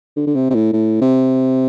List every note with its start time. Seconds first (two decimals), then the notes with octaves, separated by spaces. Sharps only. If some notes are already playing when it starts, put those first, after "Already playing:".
0.16 D3
0.27 D3
0.36 C3
0.50 C3
0.55 A2
0.73 A2
1.02 C3